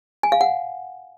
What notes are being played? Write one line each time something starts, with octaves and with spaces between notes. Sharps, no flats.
G#5
F5
F#5